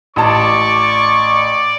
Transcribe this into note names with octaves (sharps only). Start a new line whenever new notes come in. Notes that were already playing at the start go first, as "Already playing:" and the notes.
A1 D5 A5 C#6